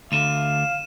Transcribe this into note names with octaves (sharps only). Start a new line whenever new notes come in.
D2 D3 F5 D#7 E7